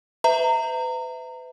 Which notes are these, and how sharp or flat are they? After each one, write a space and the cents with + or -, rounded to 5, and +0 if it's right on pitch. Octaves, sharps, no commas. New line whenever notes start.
B4 +35 E5 -10 A#5 -25